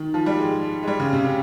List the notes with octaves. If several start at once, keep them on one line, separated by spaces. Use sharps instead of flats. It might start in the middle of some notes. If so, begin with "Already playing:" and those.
Already playing: D#3
F3
G3
G#3
G#3
G3
C#3
C3
C#3